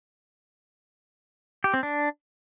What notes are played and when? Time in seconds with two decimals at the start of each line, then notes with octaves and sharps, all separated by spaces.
1.64 G4
1.74 C4
1.83 D4